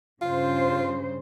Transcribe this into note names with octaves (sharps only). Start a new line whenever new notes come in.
G2 C#3 F4 C5